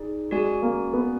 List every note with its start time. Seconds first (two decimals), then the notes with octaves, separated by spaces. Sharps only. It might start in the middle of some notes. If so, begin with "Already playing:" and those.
Already playing: D#4 G#4 D5
0.31 G#3 F#4 D5 G#5
0.62 A#3
0.93 B3